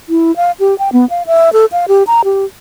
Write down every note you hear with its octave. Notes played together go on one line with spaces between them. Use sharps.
E4
F5
G4
G5
B3
F5
E5
A4
F5
G4
A#5
G4